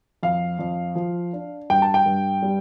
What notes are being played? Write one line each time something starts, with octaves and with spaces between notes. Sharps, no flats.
F2 F5
F2
F3
D4
G2 G5
A5
G5
G2
G3